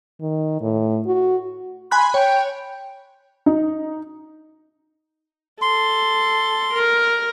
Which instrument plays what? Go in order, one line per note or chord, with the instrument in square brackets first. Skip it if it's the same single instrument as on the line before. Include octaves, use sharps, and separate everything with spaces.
[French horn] D#3
A2
F#4
[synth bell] G#5 B5 F#6 [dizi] C6
[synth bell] C#5 [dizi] G5
[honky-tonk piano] D#4
[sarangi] A4 [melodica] C6
[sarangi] A#4